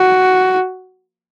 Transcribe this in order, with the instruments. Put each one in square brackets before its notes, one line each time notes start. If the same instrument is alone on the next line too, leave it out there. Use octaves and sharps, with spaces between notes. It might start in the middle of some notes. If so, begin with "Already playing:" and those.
Already playing: [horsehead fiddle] F#4